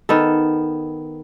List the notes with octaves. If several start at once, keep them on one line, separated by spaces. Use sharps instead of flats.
D#3 B3 A4